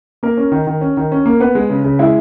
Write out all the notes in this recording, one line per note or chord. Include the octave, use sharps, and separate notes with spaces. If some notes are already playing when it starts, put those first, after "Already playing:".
A#3 A#4
C#4
D#3
D#3
C#4
D#3
C#4
A#3
B3 B4
G#3
C#3
C#3
G#3 E4